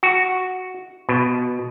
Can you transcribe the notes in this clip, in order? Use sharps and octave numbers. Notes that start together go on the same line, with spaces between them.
F#4
B2